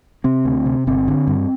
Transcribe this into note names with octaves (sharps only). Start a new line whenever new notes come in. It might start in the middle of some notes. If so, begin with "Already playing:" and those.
C3 C4
D2
C3
G1 C4
D3
G2